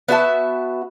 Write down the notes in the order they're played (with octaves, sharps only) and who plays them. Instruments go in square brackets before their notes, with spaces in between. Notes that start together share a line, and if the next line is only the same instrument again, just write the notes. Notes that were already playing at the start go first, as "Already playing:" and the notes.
[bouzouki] B3 F#4 E5 A5